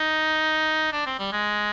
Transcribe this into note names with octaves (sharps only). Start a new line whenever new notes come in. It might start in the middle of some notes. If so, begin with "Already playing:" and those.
Already playing: D#4
D4
C4
G3
G#3